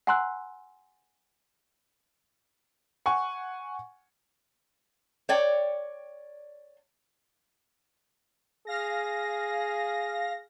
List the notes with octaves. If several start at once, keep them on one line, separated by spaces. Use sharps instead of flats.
F#5 G#5 A#5 C6 E6 F#6
F#5 G#5 C#6
C#5 D5 G5
G#4 F5 A#6